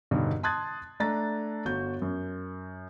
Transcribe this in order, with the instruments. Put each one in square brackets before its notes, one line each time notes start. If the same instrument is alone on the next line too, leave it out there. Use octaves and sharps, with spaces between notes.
[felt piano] E1 G2 B2 D3 D#4
A5 C6 D#6 F#6 G#6 A6
A3 D4 A#5 A6
G1 F#4 G6
F#2